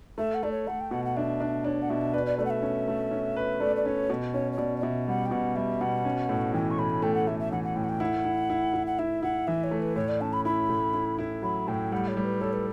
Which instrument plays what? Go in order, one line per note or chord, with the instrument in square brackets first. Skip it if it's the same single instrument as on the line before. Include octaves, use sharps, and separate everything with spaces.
[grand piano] A3 [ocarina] E5
[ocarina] F#5
[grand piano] A3 [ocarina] D5
[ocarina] C#5
[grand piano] A3 [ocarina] F#5
[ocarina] G5
[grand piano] B2 [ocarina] F#5
[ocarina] F#5
[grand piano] D4 [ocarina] E5
[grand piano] D4
[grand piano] D4 [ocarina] C#5
[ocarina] F#5
[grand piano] B2 [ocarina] E5
[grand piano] B4 [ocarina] D5
[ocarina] D5
[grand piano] A3 [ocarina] D5
[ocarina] F#5
E5
[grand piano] C#4
A3
C#4
B4
[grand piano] A3 [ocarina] D5
[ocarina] D5
[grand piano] C#4 [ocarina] C#5
[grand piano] B2
[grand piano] C#4 [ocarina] C#5
[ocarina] C#5
[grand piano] B2 [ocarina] D5
[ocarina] D5
[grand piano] B2 [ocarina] E5
[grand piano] G3 [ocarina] F#5
[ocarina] G5
[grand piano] B2 [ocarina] F#5
[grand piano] G3 [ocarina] E5
[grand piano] B2 [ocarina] F#5
[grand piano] C#4
A2
[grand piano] E3 [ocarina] G5
[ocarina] C#6
[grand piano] A2 [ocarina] B5
[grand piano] A3 [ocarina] G5
[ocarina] F#5
[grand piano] A3 [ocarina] E5
[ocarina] E5
[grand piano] E3 [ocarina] F#5
[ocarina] F#5
[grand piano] A2 [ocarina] G5
[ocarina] F#5
G5
[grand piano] E4 [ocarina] F#5
[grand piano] E4
E4
E4
[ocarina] F#5
[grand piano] E4 [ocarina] E5
[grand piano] E4 [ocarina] F#5
[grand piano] E3 [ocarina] E5
[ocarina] C#5
[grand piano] A3
[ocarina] B4
[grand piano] A2 [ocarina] C#5
[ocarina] D5
[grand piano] C#4 [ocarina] A5
[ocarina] B5
[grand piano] E4 [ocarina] B5
[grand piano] A2
E4
E4
[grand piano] F#3 [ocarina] B5
[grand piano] A2 [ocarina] G5
[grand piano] G3 [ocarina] F#5
[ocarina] C#5
[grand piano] G3
[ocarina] B4
[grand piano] A4 [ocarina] C#5
[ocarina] B4